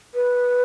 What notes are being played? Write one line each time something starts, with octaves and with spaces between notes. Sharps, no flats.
B4